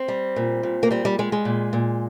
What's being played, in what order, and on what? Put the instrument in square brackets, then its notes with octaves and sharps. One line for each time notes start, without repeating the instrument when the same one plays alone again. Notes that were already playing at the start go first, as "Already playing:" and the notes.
Already playing: [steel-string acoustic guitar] C4
G3
A#2
A#2
A#3
G3 C4
G3
G3 G#3
G#3
A#2
A#2